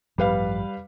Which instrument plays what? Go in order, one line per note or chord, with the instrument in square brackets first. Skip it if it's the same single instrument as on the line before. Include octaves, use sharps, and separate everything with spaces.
[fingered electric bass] A1 G2 F3 [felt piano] G3 B4 F5